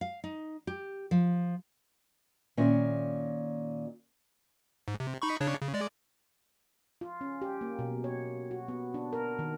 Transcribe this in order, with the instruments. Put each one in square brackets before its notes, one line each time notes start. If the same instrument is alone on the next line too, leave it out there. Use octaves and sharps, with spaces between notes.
[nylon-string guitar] F5
D#4
G4
F3
A#2 D#3 C#4 F4 E5
[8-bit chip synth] G#2
C3
D#4 B5 C#6
C#3 D4 C#5
C#3
G#3 D5
[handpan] F4
C#4
G4
A#3
B2
C#5
F#4
B3
D4
A#4
D#3